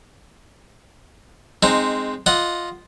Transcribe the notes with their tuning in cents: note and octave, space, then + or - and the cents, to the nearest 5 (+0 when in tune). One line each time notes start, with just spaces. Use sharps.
G#3 +0 C4 +0 D#4 -15
F4 +0 D#5 +0 F#5 +0